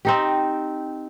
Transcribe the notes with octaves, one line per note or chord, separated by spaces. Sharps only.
C4 D#4 G4